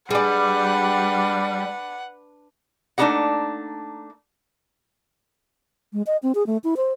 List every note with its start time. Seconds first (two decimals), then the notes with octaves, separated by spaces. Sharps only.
0.10 G3 D4 G#4 B4 D5 F#5
2.98 A3 A#3 D4 D#4 G#4 F#5
5.93 G#3
6.07 D#5
6.23 C4
6.35 G#4
6.47 A3
6.64 E4
6.77 C5